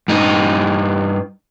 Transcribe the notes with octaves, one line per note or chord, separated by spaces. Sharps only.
G2 D#4